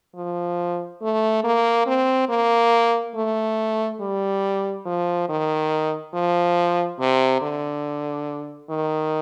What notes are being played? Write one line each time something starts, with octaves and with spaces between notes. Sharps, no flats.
F3
A3
A#3
C4
A#3
A3
G3
F3
D#3
F3
C3
D3
D#3